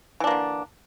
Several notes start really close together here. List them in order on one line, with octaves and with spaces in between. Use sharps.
E3 D4 A#3 D3